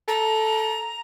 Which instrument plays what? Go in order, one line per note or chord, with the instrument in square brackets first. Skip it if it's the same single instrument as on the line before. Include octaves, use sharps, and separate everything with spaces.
[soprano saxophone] A4 [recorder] A#5